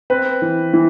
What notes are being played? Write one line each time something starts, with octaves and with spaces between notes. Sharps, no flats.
C4 B4
E3
E3